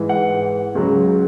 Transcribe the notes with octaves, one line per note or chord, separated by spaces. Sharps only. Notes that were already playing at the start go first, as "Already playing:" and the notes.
Already playing: G#2 E3
F#5
C#2 C#3 F#3